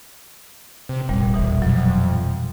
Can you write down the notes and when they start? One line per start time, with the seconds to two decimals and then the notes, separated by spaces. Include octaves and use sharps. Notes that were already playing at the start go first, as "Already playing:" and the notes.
0.89 C3
1.09 F1 A#2 G3
1.34 D#1 B2 E3
1.62 F2 F#3